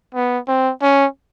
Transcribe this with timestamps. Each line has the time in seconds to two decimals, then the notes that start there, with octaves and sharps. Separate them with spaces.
0.15 B3
0.48 C4
0.82 C#4